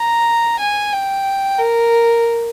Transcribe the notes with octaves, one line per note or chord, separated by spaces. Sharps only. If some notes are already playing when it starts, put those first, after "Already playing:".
Already playing: A#5
G#5
G5
A#4